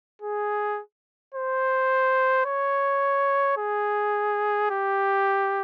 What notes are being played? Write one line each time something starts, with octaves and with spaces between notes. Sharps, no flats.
G#4
C5
C#5
G#4
G4